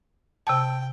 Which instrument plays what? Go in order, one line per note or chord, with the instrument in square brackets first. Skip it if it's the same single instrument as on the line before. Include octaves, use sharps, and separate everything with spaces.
[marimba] C3 A5 [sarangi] G5